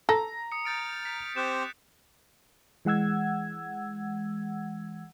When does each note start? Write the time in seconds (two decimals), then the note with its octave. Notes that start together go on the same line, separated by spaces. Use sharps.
0.09 A4 A#5 A#6
0.52 D#6 C#7
0.65 F6 G6 A6 D7
1.05 G6 B6
1.36 C4 G4 C5 D#6 F#6 E7
2.85 E3 G#3 F#5 E6 G#6